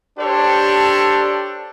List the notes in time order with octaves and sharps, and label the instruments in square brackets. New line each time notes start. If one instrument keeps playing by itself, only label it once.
[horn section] D4 G4 A4 C5 C#5